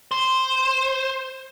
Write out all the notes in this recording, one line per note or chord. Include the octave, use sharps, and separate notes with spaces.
C5